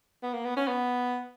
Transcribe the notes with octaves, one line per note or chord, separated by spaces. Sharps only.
B3
A#3
B3
C#4
B3